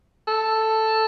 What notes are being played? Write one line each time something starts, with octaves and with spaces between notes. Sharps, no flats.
A4